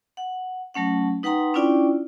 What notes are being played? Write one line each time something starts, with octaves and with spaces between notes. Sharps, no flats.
F#5
F#3 A3 C#4 F#5
D#4 B4 F#5 G5 A#5 C6
C#4 D4 E4 F4 D5 G5